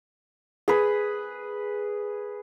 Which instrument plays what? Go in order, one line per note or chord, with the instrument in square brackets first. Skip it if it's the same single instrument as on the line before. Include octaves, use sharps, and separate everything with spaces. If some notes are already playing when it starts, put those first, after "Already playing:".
[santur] G#4 B4